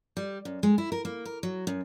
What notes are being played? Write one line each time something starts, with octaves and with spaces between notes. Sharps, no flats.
G3
F#2
G#3
E4
A#4
A#3
A#4
F#3
F#2